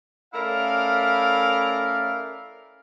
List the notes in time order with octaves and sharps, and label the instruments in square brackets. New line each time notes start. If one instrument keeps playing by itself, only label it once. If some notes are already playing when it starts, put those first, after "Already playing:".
[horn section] A3 C#4 E4 A#4 D5 F5